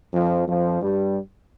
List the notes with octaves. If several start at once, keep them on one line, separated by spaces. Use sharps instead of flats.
F2 F3
F2 F3
G2 G3